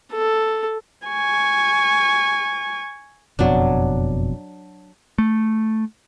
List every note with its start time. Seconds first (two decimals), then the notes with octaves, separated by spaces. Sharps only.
0.13 A4
1.07 G#5 C#6
3.39 F#1 F2 B2 F#3 D4
5.18 A3